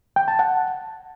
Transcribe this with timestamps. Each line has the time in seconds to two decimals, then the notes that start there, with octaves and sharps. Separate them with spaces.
0.16 G5
0.28 A5
0.39 F#5